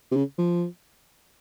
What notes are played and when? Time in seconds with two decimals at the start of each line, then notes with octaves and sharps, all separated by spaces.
0.11 C3
0.17 C#3
0.38 F3